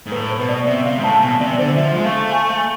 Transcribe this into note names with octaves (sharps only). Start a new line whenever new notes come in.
G#2
A2 B4
C5
B2
D5
C3 E5
C3 F5
G#2
A2 A5
B2 G#5
C3 D5
D3 C5
F3 E5
G#3
A3 F5
G#5
F5